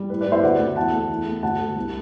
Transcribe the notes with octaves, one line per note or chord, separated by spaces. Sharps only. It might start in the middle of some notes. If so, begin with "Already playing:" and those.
Already playing: G3
A2 B4
B4 D5
A2
C5 E5
D2 D5 F#5
D2
E2 F#5 A5
A3
E2
A3
D2 F#5 A5
D2
C2